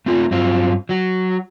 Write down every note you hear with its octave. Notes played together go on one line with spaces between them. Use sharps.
A3 C4 F4 A4
G2 F#3 C4 F4
F#3 F#4